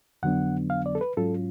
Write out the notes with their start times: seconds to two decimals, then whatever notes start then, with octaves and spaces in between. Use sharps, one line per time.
0.23 F2 D3 F#3 B3 D4 F#5
0.70 F5
0.86 D5
0.95 A4
1.01 B4
1.17 G#2 F#3 C#4 F4 A4